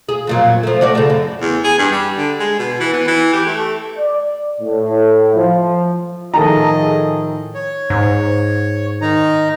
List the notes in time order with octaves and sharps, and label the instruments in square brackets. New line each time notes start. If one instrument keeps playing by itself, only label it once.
[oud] G#4
F2 A#2 F#3
F3 A3
A3 F#4 D5
C#3 A3
F#2
[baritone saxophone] E2
G#4
G2
G3
D3
G#3
B2
E3
B3
E3
G4
A3
[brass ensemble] D5
A2
F3
[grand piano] A2 D#3 F3 [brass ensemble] G#4 D#5 [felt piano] A4 A5 A#5
[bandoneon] C#5
[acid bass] G#2
[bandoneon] D#3 D#4 A#5